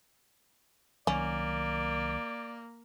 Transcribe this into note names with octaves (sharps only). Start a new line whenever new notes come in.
C2 D#3 F#3 A#3 C#4 D5